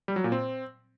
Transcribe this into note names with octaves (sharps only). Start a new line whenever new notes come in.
G3
F#3
A#2
C4